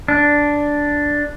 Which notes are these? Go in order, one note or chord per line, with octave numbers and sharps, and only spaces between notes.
D4